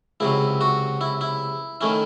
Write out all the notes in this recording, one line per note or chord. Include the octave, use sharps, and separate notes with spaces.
C#2 C3 F#3 E4
F#4
E4
E4
D#3 A3 C#4 E4